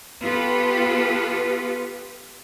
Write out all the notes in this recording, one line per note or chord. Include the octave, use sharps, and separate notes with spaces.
B3 F4 G4 A4 B4